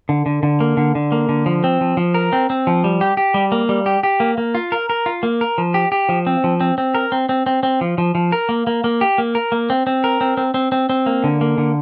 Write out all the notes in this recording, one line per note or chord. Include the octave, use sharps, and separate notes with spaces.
D3
D3
D3
A#3
D3
D3
A#3
D3
F3
C4
F3
F3
A#4
C4
C4
F3
G3
G4
G4
G3
A#3
G3
G4
G4
A#3
A#3
F4
A#4
A#4
F4
A#3
A#4
F3
G4
G4
F3
C4
F3
C4
C4
A#4
C4
C4
C4
C4
F3
F3
F3
A#4
A#3
A#3
A#3
G4
A#3
A#4
A#3
C4
C4
A#4
C4
C4
C4
C4
C4
A#3
D3
A#3
D3